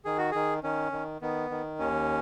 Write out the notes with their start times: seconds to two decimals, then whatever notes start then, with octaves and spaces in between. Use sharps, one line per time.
0.05 D#3 G#4
0.18 F#4
0.31 D#3 G#4
0.63 D#3 C#4
0.92 D#3
1.22 D#3 B3
1.50 D#3
1.79 D#2 C#4